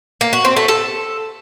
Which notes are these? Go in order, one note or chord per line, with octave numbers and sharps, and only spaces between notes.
A#3
F#4
C4
A3
A4